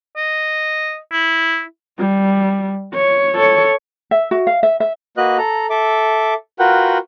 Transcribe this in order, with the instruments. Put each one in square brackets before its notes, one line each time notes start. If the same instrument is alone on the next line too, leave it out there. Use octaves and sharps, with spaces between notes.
[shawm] D#5
E4
[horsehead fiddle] G3
C#5
A4 C#5
[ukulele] E5
F#4
F5
E5
E5
[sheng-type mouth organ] A#3 F#4 B4 D#5 F#6
A4 A#5
A4 E5 D6
F4 F#4 A#4 B4 F#5 G5